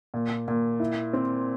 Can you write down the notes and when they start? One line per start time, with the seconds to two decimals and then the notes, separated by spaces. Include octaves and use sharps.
0.14 A#2
0.48 A#2
0.80 E4
1.13 C4